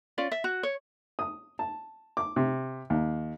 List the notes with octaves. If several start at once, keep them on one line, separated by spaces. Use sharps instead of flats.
C#4 F4 D5
E5
F#4
C#5
D#6
A5
D6
C3
D#2